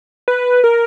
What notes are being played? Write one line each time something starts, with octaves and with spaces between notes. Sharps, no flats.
B4
A#4